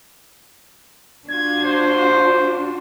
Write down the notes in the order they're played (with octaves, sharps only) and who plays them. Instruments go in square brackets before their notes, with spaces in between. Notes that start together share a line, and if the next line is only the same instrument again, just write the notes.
[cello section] D4 F4 F#4 [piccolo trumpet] G#6
[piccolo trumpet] C5